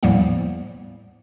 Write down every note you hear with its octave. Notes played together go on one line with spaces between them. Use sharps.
E2 A2 F3 G3 A#3 B3